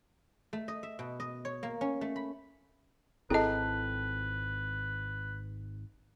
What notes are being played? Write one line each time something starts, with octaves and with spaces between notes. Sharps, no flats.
A3
D#5
E5
B2
D#5
C#5
A#3
C#4
A3
B5
G#1 C4 E4 G#4 A4 B4 D#5 A5